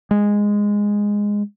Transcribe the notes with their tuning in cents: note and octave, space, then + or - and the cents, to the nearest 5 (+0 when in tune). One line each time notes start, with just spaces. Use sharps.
G#3 -10